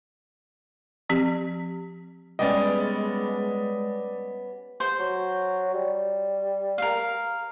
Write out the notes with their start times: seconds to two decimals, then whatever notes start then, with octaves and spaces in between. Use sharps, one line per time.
1.09 F3 C4 G4
2.39 G3 G#3 B3 C#4 D5 D#5
4.80 C5
4.99 F#3
5.74 G3
6.78 A#4 F5